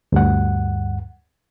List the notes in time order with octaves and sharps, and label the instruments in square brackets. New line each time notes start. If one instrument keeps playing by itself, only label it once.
[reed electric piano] D2 G2 F#5